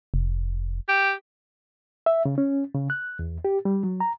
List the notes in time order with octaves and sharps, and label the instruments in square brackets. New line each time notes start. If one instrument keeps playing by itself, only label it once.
[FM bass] F1
[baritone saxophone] G4
[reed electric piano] E5
C#3
C#4
C#3
F#6
E2
G4
G3
F#3
A#5